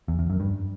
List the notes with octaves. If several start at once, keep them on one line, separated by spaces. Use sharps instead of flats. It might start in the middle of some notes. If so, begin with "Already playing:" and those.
E2
E2
F#2
G2